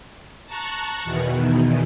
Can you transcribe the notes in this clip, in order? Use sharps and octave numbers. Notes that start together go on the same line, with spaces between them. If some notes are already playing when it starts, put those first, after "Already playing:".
A5 A#5 C#6 F#6
E2 B2 D#3 E3